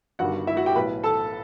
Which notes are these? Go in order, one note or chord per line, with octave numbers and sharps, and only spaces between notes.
G1 G2 D#3 G3 F#4 F#5
E4 E5
F#4 F#5
G4 G5
B1 A2 E3 B4 B5
A4 A5